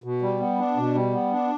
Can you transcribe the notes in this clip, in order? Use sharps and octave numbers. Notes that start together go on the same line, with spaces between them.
B2
G3
B3
D4
B2
G3
B3
D4